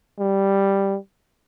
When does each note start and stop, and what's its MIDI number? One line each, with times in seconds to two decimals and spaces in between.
0.19 0.97 55